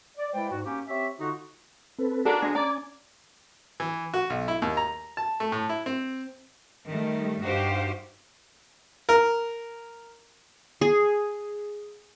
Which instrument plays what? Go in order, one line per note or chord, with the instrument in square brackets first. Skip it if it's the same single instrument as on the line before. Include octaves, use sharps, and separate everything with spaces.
[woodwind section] D5
G#3 E4 B4 C5 D5 G5
G#2 F#4
A#3 C#4 G4
C4 G4 C#5 E5
D3 D#4 F4 F#4
[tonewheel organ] C4 A4 B4
[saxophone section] D#3 D4 [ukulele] F#4 A4 [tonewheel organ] A#5
[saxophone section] D2 G#3 G#4 [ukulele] D4
[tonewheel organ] C#4 G#5 D6 [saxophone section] D5 [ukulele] A#5
[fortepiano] E3
F#4
B1
E4
D#2
A#5
A5
A3
A2
E4
C4
[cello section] D#3 G3 A3
G2 D#4 F#4 G4 C5 F5
[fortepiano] A#4
[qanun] G#4